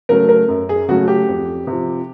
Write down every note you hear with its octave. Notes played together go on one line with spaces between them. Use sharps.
C#3 F#3 A3 A#4
A#4
F#2
G#4
C#3 F#3 A3 F#4
G4
F2
C3 F3